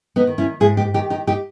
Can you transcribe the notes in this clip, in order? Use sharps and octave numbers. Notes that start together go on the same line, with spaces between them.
B3 D#4
D#3
C#4 E4
G#2 E4 G#4
D#4 G4
D#3 D#4 G4
D#4 G4
D#4 G4